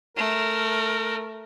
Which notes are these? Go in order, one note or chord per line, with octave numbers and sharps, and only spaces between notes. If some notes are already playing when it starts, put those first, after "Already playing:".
A3 A#4